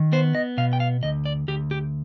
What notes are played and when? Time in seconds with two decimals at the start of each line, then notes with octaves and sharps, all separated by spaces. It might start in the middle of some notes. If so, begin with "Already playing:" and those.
Already playing: D#3
0.13 B3 C5
0.35 D#5
0.57 B2 F5
0.73 G5
0.80 F5
1.03 D2 D#5
1.26 D5
1.48 D2 G4
1.71 G4